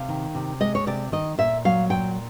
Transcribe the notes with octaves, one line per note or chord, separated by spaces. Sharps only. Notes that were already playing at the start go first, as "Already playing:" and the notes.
Already playing: C3 F5
D#3
C3
G#3 D#5
C#5
C3 D5
D#3 D#5
A#2 E5
F#3 F5
A#2 G5